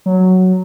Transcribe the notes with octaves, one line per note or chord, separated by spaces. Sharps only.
F#3